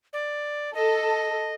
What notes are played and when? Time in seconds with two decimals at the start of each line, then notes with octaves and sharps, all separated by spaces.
0.13 D5
0.75 A4 D#5